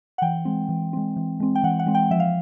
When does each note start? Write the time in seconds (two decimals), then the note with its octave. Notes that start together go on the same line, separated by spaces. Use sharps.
0.18 F#5
0.22 E3 G5
0.45 G#3 C4
0.69 E3
0.93 G#3 C4
1.16 E3
1.40 G#3 C4
1.55 G5
1.63 E3 F#5
1.79 F#5
1.87 G#3 C4
1.95 G5
2.11 F3 E5
2.20 F5